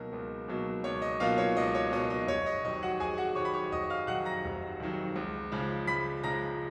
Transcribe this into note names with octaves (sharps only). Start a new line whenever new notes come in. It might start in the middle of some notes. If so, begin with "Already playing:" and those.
Already playing: C#2 B2 F#3 A#3 D#4 A#4
C#2
B2 F#3 A#3 D#4
C#2 C#5
D#5
B2 F#3 A#3 D#4 F4 F5
C#5
C#2 D#5
C#5
B2 F#3 A#3 D#4 D#5
D#5
F1 C#5
D#5
F2 D#3 F#3 D#5
F#4 F#5
F1 G#4 G#5
F#4 F#5
F2 D#3 F#3 C#5 C#6
B5
C#5 C#6
F1 D#5 D#6
F5 F6
F2 D#3 F#3 F#5 F#6
A#5 A#6
F1
F2 D#3 F#3
C#2
C#3 F3 G#3
C#2 B5 B6
C#3 F3 G#3 A#5 A#6